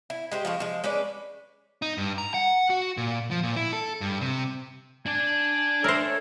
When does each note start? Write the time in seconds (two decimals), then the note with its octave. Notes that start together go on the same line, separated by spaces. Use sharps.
0.10 E4
0.32 G#3 G4 C5
0.45 F3 G#3 C#5
0.60 F3 G#3
0.84 G#3 C#4 B4 D5
1.82 D#4
1.98 G2
2.18 A#5
2.34 F#5
2.70 F#4
2.97 A#2
3.31 F3
3.43 A#2
3.56 E4
3.73 A4
4.01 G2
4.21 C3
5.06 D4 D5 G#5
5.84 A3 A4 A#4 C5 C#5